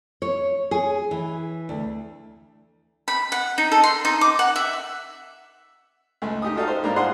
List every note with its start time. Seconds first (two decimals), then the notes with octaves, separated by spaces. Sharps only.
0.22 C#5
0.71 G#4
1.11 E3
1.69 D2
3.08 B5
3.32 F#5
3.58 D#4
3.72 A4
3.84 C6
4.05 D#4
4.21 D6
4.39 F#5
4.56 E5
6.22 C#2 A3
6.42 D#4 G4 D#6
6.55 D#4 F4 F#4 A4 D#5 F5
6.68 C5
6.83 G#2 G3 A#3 D4 A#5
6.96 F4 G#4 C5 D#5 F#5 C6